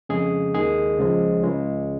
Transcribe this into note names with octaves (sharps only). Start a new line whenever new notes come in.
F2 C#3 G#3 G#4
D#2 D#3 G#3 G#4
C#2 C#3 F3 G#3
C#2 C#3 G#3